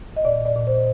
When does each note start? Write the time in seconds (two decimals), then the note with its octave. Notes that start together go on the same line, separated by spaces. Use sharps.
0.16 D#5
0.25 A#2 D5
0.46 D5
0.56 A#2
0.67 C5